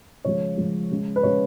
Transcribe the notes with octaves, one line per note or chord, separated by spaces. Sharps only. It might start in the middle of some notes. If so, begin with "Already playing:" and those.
C#3 F3 G#3 C#5
C#3 F3 G#3
C#3 G#3 C#4
B4
C#3 G#3 C#4 C#5